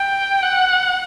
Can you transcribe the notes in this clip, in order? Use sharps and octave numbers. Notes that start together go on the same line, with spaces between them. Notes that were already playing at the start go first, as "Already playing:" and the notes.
Already playing: G5
F#5